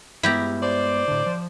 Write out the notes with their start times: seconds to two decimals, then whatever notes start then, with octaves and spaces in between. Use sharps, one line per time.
0.23 G2 G#3 B3 E4 G4 A#5
0.62 C5 D5
1.08 A2 D3
1.26 F3